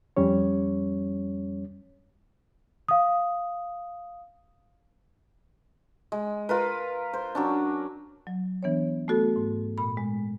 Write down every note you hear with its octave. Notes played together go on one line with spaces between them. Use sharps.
F2 G3 C#4 C#5
F5 D#6
G#3
F4 A#4 B4
C5
F#3 C#4 D4
F#3
E3 B3 D4 C#5
A3 B3 F#4 A4
G#2
A#2 B5
G#3